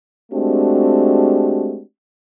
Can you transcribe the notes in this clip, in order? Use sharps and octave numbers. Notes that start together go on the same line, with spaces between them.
G#3 A3 C4 D4 F#4 G4